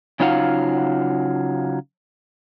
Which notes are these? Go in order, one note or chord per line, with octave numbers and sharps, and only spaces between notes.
C#3 F#3 D#4 F4 F5 F#5